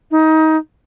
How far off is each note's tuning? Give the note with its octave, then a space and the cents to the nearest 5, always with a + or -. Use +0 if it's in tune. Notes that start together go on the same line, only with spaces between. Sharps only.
D#4 +20